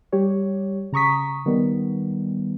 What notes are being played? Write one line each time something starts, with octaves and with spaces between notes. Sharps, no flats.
G3 G4 C#5
C#3 A#5 C#6 D#6 B6
D#3 G3 B3